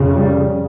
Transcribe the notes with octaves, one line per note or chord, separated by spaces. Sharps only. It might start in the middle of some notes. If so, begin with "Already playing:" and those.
Already playing: F2 C#3
G3